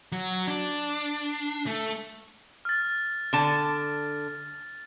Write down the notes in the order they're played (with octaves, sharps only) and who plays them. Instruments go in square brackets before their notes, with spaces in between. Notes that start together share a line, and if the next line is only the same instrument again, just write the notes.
[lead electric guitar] F#3
D4
A3
[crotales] F6 A6
[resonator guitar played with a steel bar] D3 A5